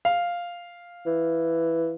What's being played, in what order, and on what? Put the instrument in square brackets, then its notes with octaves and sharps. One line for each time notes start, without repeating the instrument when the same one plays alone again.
[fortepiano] F5
[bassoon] E3